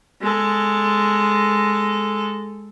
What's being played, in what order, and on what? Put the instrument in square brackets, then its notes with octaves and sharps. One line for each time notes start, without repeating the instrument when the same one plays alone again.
[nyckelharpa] G#3 A4